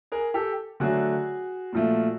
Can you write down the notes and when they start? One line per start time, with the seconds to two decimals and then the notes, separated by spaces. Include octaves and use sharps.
0.12 G#4 A#4
0.34 G4 A4
0.80 D3 F#3 A3 F#4 G#4
1.73 A#2 F3 A3